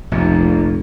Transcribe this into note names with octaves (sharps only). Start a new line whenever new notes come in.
F1 A#1 A#2